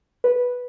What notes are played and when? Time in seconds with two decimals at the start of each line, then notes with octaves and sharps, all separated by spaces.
0.24 B4